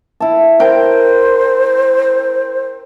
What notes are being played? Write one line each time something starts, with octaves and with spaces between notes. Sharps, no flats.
E4 A5
A#4 C5 G5